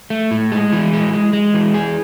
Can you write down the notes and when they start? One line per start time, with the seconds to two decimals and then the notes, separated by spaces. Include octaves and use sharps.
0.10 A3
0.31 A2
0.52 G#3
0.72 E3
0.93 G#3
1.13 G#3
1.33 G#3
1.54 E3
1.74 G#4